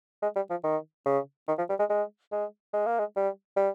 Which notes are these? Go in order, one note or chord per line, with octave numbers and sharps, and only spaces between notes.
G#3
G3
F3
D#3
C#3
D#3
F3
G3
G#3
G#3
G#3
G#3
A#3
G#3
G3
G3